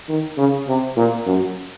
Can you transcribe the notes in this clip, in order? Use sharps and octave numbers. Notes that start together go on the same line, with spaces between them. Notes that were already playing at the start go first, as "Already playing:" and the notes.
D#3
C#3
C3
A#2
F#2